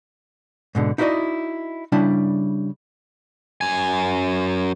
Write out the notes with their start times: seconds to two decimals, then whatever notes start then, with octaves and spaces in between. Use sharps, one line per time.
0.75 G#2 B2 D3
0.98 D#4 E4 F#4 B4 D5 D#5
1.92 C#3 G3 D4 E4
3.61 F#2 G#5